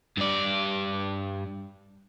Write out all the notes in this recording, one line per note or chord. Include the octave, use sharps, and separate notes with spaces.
G2 D5